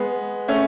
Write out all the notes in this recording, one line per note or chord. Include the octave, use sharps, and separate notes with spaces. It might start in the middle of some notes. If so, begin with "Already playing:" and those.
Already playing: G#3 B3
A3 C#4